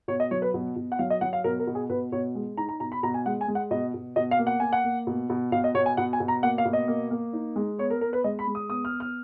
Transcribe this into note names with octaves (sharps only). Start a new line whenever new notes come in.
B2 C#5
D#5
F#3 C#5
B4
B2
B2
F#5
F#3 F5
D#5
F#3 F#5
F5
B2 A#4
A#4
B2
G#4
B2 B4
B2 C#5
G#3
D#4 A#5
A#5
B2 A#5
B5
B2 A#5
G#5
G#3 F#5
G#5
G#3
F#5
B2 D#5
B2
B2 D#5
F5
A#3
F#5
A#3 G#5
F#5
A#3
B2
B2
B2 F5
D#5
B2 C#5
G#5
B2 F#5
G#5
B2
A#5
A#3 F#5
F5
B2
D#5
A#3
A#3
D#4
G#3
B3 C#5
A#4
B3 A#4
B4
G#3 D#5
B5
G#3
D#6
B3 D#6
F6
B3
F6